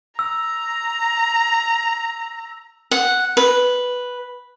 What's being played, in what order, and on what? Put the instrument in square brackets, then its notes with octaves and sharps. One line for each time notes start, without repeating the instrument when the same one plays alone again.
[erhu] A#5 [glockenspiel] E6
[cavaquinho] F#5
B4